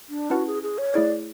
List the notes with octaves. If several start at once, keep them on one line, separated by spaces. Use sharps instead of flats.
D4
C#4 E4 F#4 B4 F#5 A5
G#4
G#4
C#5
A3 E4 G#4 C#5 D5